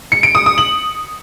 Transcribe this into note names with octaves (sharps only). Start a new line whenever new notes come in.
C#7
D7
D#6
D#6
F#7